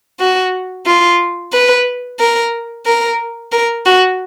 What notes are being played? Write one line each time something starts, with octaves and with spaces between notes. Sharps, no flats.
F#4
F4
B4
A#4
A#4
A#4
F#4